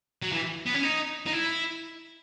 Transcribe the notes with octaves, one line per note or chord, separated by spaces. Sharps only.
F#3
E3
B3
C#4
D#4
D#4
E4